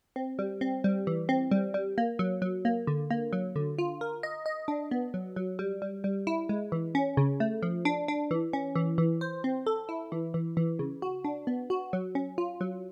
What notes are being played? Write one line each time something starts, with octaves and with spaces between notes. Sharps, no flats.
C4
G3
C4
G3
E3
C4
G3
G3
A#3
F#3
F#3
A#3
D3
A#3
F#3
D3
F4
A#4
D#5
D#5
D4
B3
F#3
F#3
G3
G3
G3
E4
G#3
E3
C#4
C#3
A3
F3
D4
D4
E3
C#4
E3
E3
C5
C4
A4
E4
E3
E3
E3
C#3
F#4
D4
B3
F#4
F#3
C#4
F4
F#3